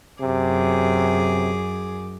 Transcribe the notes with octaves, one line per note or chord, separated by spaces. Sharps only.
F#2 C3 G#4 D6